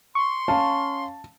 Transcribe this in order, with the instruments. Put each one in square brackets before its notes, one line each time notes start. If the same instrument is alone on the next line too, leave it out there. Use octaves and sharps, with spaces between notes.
[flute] C6 [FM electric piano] C#6
[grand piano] C#4 F5 [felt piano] A5